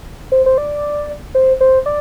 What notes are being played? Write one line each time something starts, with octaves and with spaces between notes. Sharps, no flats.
C5
C5
D5
C5
C5
D5